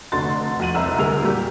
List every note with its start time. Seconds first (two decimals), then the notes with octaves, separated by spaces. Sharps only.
0.12 F1 D3 A3 F#4 C6 A6
0.60 F2 F#4 D#7 F#7
0.75 F1 C2 E5 A#5 E6
0.98 D2 G3 G#4 A#4 F7
1.22 A#2 F#3 G3 G4